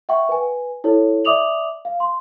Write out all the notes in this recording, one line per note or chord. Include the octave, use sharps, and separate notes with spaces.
E5 F#5 G5 C#6
B4 G#5
E4 A4 C#5
D5 E5 D6 D#6 F7 F#7
F5
C6